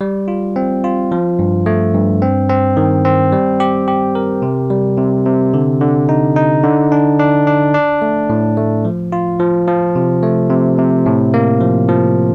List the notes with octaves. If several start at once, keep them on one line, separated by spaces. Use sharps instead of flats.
G3
F4
C4
F4
F3
G2
A3
G2
C4
C4
D#3
C4
G3
G4
G4
A#4
C3
G3
C3
C3
D3
D3
D#4
D#4
D3
D4
D4
D4
D4
A3
A2
A3
F3
F4
F3
F3
C3
A3
C3
C3
A2
A#3
F3
F3